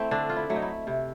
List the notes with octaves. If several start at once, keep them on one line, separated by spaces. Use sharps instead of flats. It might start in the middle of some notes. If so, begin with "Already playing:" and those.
Already playing: A3 C4 E4
D3 D4
F4
E4
F#3 A3
D#4
E4
C3 E4